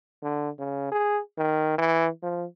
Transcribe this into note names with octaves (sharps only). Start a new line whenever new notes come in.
D3
C#3
G#4
D#3
E3
F3